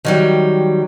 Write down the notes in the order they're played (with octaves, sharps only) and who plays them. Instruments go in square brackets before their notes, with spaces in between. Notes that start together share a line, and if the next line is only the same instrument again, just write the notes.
[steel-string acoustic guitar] D#3 F#3 G3